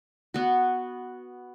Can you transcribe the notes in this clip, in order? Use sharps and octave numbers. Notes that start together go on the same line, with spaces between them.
B3 F#4